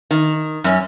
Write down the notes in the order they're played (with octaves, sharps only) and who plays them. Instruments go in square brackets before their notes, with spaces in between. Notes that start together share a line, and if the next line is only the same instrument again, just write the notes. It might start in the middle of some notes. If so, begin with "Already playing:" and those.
[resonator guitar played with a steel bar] D#3
F#2 C#4